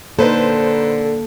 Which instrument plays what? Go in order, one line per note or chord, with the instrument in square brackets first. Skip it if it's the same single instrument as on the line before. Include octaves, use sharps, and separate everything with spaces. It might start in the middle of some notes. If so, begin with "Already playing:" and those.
[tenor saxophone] D3 [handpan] A#3 [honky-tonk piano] D#4 B4 C5 [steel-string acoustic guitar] A4